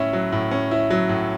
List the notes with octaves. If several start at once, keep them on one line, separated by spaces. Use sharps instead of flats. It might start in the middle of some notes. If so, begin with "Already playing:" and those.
Already playing: A2 C#4 E4
F#3
A2
C#4
E4
F#3
A2